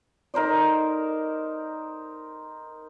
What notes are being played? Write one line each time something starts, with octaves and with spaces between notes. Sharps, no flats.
D#4 A#4 C5 D5